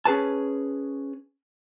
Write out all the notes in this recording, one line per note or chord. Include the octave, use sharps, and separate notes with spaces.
C#4 G#4 B4 A5